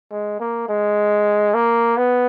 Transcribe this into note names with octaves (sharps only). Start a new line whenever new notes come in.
G#3
A#3
G#3
A#3
B3